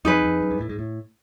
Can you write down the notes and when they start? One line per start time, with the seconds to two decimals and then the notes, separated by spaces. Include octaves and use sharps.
0.05 F2 D#4 G#4 B4
0.24 F2
0.42 F#2
0.51 G2
0.61 A2
0.69 G#2
0.79 A2